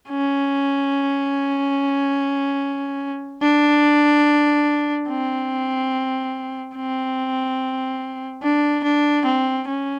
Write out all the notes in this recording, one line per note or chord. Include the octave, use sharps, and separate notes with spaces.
C#4
D4
C4
C4
D4
D4
C4
C#4